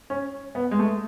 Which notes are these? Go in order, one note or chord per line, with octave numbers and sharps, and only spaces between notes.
C#4
B3
G#3
A3